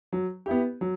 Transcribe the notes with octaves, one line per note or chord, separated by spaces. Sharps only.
F#3
B3 E4 G4
F#3